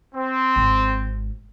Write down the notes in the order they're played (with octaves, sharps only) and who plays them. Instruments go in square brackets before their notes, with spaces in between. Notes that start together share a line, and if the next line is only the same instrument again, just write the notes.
[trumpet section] C4
[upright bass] G#1